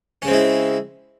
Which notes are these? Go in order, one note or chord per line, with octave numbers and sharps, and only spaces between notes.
C#3 G#3 C4 C#4 E4